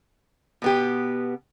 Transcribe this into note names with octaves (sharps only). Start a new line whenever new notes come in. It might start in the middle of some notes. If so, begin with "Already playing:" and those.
B2 B3 G4